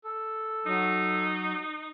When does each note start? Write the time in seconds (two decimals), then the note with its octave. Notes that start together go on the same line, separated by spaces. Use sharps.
0.04 A4
0.66 F#3 D#4